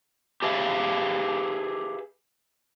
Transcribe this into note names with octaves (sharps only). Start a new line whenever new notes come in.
G4 G#4 B4 E5 F5